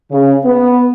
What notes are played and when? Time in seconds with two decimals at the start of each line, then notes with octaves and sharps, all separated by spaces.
0.11 C#3
0.44 B3